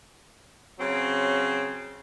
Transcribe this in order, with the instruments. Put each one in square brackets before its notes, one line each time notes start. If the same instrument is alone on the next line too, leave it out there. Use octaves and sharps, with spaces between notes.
[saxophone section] C#3 F#3 C4